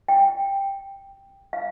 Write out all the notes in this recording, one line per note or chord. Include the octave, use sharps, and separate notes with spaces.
G5
F5